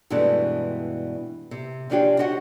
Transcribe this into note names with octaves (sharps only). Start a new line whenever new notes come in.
G2 B2 E3 G#3 A3 D4
C3
C3 F3 C#4 D4 F4 G4
F#4 G4 C#5 D#5 F#5